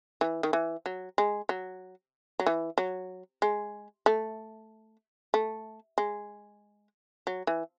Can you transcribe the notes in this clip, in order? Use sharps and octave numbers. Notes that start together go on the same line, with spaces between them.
E3
D#3
E3
F#3
G#3
F#3
F#3
E3
F#3
G#3
A3
A3
G#3
F#3
E3